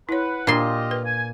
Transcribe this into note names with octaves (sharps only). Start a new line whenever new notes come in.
E4 B4 C#5 F#5
A#2 D4 F4 G4 D#5 C6
B4
G#5